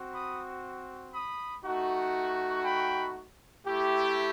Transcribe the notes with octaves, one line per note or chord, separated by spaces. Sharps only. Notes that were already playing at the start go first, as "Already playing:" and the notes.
Already playing: C4 F#4
B5 D#6
B5 D#6
A3 D#4 F#4
G5 B5
A3 E4 G4